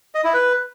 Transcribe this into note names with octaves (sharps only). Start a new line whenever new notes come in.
D#5
E4
B4